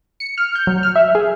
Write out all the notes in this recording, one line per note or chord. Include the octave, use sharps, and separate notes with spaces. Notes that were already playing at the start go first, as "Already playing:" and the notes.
C#7
F6
G6
F#3
F6
E5
G#4